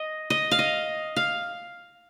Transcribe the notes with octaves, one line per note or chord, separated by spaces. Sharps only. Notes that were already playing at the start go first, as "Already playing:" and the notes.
Already playing: D#5
D#5
F5
D#5
F5